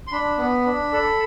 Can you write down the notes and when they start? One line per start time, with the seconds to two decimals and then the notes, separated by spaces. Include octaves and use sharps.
0.07 C6
0.12 D4 B5
0.38 B3
0.65 D4
0.92 A4